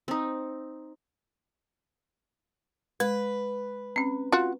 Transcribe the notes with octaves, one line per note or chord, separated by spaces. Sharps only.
C4 D#4
G#3 B4
C4 C#4
F4 F#4